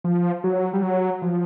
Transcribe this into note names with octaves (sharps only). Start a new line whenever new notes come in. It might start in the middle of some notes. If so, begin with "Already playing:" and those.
F3
F#3
G3
F#3
F3